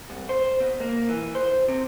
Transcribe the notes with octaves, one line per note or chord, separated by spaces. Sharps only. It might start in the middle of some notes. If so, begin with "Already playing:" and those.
C2
C5
B2
A#3
E3
C5
C3